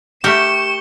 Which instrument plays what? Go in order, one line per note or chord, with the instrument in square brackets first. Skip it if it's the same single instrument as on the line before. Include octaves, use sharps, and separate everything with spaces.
[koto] A3 A#4 [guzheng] G4 [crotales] C#6 C#7 G7 [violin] E7